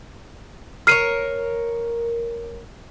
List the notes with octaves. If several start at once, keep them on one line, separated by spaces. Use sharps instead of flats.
A#4 B4 C#5 F6 C7 D#7